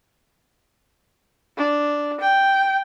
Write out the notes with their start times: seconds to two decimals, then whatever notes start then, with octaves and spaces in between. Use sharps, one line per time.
1.57 D4
2.21 G5